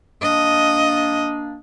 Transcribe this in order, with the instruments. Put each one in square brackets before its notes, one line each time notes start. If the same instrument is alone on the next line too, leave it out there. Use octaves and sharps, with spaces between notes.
[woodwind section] A#3 D4 [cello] D#5